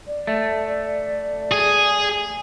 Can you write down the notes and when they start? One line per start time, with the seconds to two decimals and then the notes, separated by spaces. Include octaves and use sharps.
0.07 D5
0.27 A3
1.52 G#4